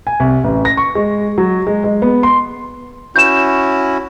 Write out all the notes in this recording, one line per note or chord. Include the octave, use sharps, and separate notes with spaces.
G#5
C2
A1
A#6
C#6
G#3
F#3
G#3
G#3
B3
C6
C#4 E4 F#4 G6 E7